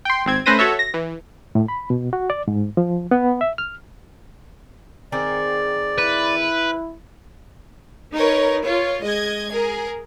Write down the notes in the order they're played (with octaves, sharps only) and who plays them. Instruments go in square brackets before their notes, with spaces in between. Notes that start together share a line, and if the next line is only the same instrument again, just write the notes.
[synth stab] G5 C6
G#1 C4 G#6
A3 C#4 B4 C5 A#6 D#7
F#4 A4 C#5 E5
A#6
E3
[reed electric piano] A2
B5
B2
F#4
D5
G#2
F3
B3
E5
F6
[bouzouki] D#3 C4 G#4 [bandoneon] D5
[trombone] E4 [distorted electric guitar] B4
[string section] D#4 A#4 B4 C#5
F4 C#5
G#3 D#5 G#6
G#4 A#4